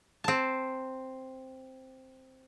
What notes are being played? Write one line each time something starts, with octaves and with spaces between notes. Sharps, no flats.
C4 A5